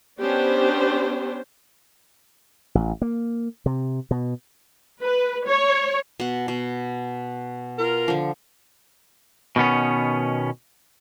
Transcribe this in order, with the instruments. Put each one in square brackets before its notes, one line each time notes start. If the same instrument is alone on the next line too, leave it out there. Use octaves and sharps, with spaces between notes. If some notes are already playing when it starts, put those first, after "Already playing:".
[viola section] B3 C#4 D4 G4 C5
[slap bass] A1
A#3
C3
B2
[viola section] B4
C#5
[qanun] B2 F#5
B2
[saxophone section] F4 A#4
[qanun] D3 F3
[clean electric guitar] B2 D#3 B3 C#4